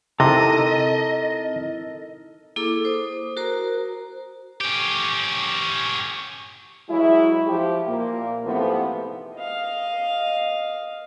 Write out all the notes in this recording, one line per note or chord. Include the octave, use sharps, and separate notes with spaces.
C3 C4 D#4 E4 A4 A#4 D#5 A#5
A#3 E4 G#4 A4 D6
C5 D#6
F#4 A#4 C5 A#5
C#4 G4
E3 F#3 G#3 E4
F3 G4
A#2 A#3
G#2 C3 E3 F3 A3 B3
D#5 F5